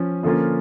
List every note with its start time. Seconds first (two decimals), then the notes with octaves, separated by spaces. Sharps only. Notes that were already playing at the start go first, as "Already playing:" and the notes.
Already playing: F3 C#4
0.23 D3 F3 A#3 C#4 F4